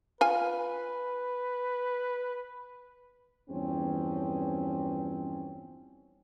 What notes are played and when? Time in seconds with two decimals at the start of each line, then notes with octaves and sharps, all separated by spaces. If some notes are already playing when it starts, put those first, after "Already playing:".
0.21 F4 B4 G#5
3.49 E2 G2 F3 C4 C#4